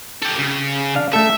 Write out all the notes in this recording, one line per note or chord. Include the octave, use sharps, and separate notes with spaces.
G4 A4
C#3
D4 F5
A3 A4 E5